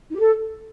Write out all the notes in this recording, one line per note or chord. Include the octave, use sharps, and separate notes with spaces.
D#4
G4
A4